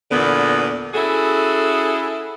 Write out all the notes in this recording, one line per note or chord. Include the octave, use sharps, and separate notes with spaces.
E2 A#2 D3 B3
C#4 E4 F#4 G#4 A4